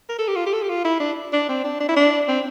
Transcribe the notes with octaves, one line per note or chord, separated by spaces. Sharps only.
A#4
A4
G4
F4
G4
A4
G4
F4
E4
D4
D4
C4
D4
D4
E4
D4
C4